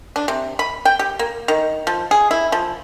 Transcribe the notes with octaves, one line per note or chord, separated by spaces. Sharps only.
D4
C3
B5
G5
G4
A#3
D#3
F3
G#4
E4
F3